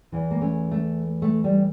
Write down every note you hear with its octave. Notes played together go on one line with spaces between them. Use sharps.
E2 E3
A#3
A3 C#4
A3
A3
G3